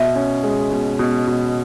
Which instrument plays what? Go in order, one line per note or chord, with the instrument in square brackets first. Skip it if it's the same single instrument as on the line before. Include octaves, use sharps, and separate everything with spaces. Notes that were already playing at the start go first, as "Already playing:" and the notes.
Already playing: [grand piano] B2 [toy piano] E5
[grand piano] C#4
G#3
B2
B2
B2